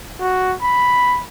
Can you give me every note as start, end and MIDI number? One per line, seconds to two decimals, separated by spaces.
0.20 0.55 66
0.62 1.23 83